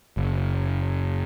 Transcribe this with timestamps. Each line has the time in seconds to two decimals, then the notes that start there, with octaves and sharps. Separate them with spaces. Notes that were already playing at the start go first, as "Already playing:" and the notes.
0.17 F#1